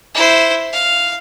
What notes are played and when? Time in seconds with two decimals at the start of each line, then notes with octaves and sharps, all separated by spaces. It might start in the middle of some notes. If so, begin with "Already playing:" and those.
0.14 E4 C5
0.73 F5